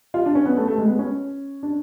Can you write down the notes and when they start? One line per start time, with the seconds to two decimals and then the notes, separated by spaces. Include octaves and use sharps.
0.14 F4
0.26 D4
0.35 C#4
0.45 B3
0.57 A3
0.68 A3
0.78 G#3
0.87 B3
0.99 C#4
1.63 D4